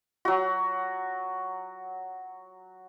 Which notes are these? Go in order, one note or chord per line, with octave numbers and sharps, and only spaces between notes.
F#3 F#4